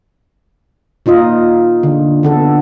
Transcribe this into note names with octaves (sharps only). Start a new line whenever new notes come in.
A#2 D#4 F4 D#5
D3
D3 B3 A4